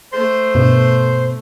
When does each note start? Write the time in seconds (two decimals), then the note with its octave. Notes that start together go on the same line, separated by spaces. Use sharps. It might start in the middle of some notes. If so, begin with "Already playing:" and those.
0.13 A3 C5 C6
0.55 G2 B2